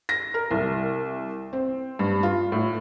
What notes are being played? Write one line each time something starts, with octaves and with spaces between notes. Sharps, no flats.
A#6
A#4
C2
C4
G2
F4
A2